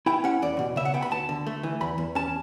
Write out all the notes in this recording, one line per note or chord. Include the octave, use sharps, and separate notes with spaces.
E4 G5
C#4 F#5
E2 D5
B2
C#3 E5
F#5
B3 G5
B5
D2 A5
D3
A3
E3
E2 B5
E2
C#4 A5